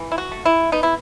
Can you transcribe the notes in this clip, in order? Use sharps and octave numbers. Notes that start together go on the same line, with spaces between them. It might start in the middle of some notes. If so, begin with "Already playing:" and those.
Already playing: E3
E4
F#4
A3
E4
B3 D#4
E4